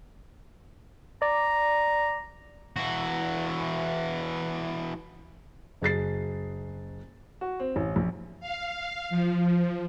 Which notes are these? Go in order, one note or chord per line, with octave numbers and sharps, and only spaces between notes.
D5 A#5
E3 F#4
F#1 G#4 A6 C7
F#4
C4
A1
A#1
F5
F3